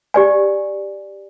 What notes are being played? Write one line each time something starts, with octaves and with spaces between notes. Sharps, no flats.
G4 D5 G#5